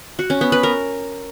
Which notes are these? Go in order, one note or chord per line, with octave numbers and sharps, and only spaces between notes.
F#4
C#4
B3
B4
A#4